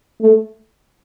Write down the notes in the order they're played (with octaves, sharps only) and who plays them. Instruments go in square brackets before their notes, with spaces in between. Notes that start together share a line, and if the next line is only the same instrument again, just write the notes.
[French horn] A3